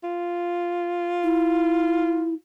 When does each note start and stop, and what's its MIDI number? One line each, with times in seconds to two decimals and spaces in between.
0.04 2.36 65
1.23 2.34 64